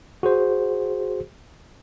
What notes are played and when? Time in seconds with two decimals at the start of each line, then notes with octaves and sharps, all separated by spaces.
0.23 F#4 G#4 C5